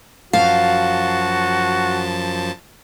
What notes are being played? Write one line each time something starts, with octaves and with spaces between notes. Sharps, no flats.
F#2 F3 F#4 F5 A5